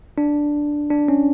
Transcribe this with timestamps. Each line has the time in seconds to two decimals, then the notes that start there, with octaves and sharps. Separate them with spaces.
0.18 D4
0.90 D4
1.08 C#4